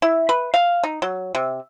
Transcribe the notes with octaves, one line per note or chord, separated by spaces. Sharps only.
E4
B4
F5
D#4
F#3
C3